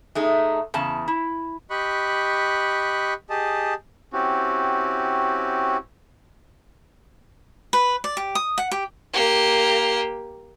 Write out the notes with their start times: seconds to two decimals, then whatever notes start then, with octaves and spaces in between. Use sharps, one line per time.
0.15 G#3 A3 D#4
0.74 E2 C#3 A5
1.08 E4
1.70 G4 D#5 B5 C#6 F#6
3.30 G4 G#4 D#5 A5
4.13 C4 C#4 E4 F#4 G4
7.73 B4
8.04 D5
8.17 G4
8.35 D#6
8.58 F#5
8.71 G4
9.13 A#3 G4